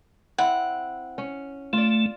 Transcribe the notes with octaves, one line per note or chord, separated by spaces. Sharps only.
C4 E4 F#5
C#4
A3 F4 D5